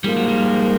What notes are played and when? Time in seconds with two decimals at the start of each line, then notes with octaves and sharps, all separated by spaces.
0.04 G#2 F3 G3 A#3
0.16 F#3
0.28 G3